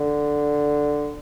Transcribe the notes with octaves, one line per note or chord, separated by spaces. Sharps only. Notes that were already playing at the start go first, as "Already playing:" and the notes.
Already playing: D3